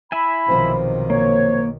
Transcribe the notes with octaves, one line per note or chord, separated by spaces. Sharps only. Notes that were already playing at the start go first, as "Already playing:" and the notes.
E4 E5 G#5 B5
B1 C3 D#3 F3 C5
A#3 C#5